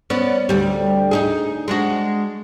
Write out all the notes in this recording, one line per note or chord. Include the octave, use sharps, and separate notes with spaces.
B3 C#4 D5
D2 G3
D#4 E4 G#4
G#3 D4 F#4